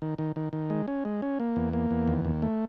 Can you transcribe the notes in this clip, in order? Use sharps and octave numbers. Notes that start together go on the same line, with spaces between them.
D#3
D#3
D#3
D#3
G#3
C#4
G#3
C#4
A#3
E2
A#3
E2
D#2
D#2
A3